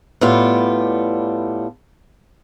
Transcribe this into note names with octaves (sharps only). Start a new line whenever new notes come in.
A2 G3 B3 D4 F4